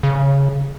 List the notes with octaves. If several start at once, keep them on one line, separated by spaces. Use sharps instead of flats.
C#3